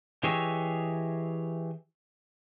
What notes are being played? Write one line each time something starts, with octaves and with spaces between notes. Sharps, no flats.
E3 G4 G#4 C#5 D#5 E5